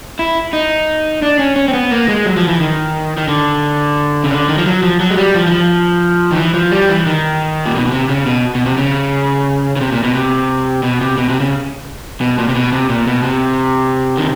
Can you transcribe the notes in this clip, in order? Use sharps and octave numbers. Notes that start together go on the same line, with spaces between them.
E4
D#4
D4
C#4
C#4
C4
B3
A#3
G#3
F#3
F3
E3
D#3
D#3
D3
C#3
D3
D#3
F3
F#3
F3
F#3
G#3
G3
F3
E3
F3
D#3
E3
F3
G3
E3
D#3
A#2
B2
B2
C3
C#3
B2
B2
C3
C#3
C#3
C3
A#2
B2
C3
B2
C3
B2
C3
C#3
B2
A#2
C3
B2
C3
A#2
B2
C3
D#3